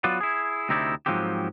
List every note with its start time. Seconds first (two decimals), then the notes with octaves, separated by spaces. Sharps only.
0.04 F#3 B3 F4 B4 D5
0.21 E4 G#4
0.69 D2 C3 C4 D#4 E4 D5
1.06 G#2 F3 F#3 A#3 C4 G4